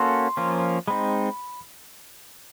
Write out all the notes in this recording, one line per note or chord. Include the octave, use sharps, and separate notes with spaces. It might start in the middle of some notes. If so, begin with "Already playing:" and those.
Already playing: A#3 C#4 F#4 A4 C6
F3 A#3 C#4 F4
G#3 C4 D#4 B5